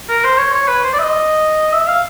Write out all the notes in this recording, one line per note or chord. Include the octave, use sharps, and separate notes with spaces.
A#4
C5
C#5
C#5
B4
C5
D5
E5
D#5
E5
F5